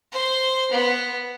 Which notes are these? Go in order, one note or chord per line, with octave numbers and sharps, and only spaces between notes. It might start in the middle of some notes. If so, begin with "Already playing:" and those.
C5 C6
B3